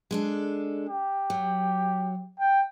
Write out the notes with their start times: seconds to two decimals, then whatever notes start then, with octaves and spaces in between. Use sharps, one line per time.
0.11 G#3 D4 A4
0.88 G4
1.30 F#3
2.39 G5